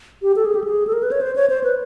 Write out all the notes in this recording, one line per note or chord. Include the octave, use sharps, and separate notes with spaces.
G4
A4
G#4
G4
G#4
A4
A#4
B4
C#5
C5
C#5
C5
B4